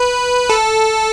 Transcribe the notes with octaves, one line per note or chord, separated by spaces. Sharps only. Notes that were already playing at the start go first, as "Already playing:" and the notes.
Already playing: B4
A4